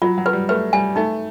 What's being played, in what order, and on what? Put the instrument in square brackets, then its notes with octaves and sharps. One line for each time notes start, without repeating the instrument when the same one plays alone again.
[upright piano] F#3 [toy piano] F4
[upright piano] F#3
[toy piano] B4
[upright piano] G3
[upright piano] A3 [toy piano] B4
[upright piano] G3 [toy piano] G#5
[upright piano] A3 [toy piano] D#4